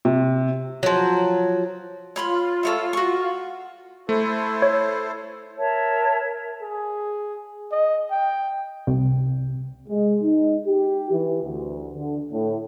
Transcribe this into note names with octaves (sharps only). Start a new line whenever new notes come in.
C3
F3 F#3
F4 C#5 B5 C6
A4 C#5 E5
F#4 C#6
A3 E4 A4 C5
C#5
A#4 C#5 E5 A5
G#4
D#5
G5
C2
G#3
D#4
G4
E3
D2
D3
A2